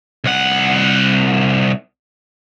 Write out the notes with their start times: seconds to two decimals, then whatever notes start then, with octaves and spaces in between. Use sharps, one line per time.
0.24 C2 F#5